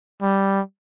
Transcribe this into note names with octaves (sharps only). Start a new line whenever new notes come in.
G3